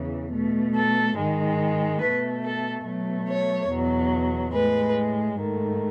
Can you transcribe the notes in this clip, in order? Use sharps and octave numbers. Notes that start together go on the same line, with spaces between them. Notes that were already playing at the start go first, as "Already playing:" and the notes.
Already playing: E2 C#3 E3
B2 A3
A4
G#2 D#3 G#3
B2 A3 B4
A4
B2 F#3 A3
C#5
E2 B2 F#3
A2 G#3 B4
G#2 D#3 A3